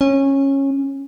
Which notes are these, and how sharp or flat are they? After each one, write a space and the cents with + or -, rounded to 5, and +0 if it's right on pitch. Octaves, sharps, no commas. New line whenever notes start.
C#4 -15